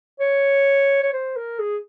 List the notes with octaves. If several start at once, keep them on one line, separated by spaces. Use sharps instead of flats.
C#5
C#5
C5
A#4
G#4